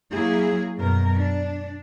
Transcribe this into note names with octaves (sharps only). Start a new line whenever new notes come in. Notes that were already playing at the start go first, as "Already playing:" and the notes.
F#3 A#3 E4 G#4
F#2 B2 A#4
D4